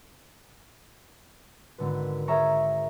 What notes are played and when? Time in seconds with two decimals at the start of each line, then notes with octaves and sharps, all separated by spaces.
1.78 G#1 D3 B4
2.27 G#4 A#4 C#5 E5 A#5 C#6